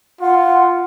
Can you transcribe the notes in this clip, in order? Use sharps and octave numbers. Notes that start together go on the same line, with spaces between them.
F4 F#5